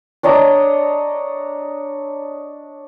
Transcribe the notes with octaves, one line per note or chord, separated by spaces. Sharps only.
D4 C#5 D#5 A#5